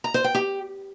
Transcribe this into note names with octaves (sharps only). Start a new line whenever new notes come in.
A#5
C5
G5
G4